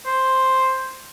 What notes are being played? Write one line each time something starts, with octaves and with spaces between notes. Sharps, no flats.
C5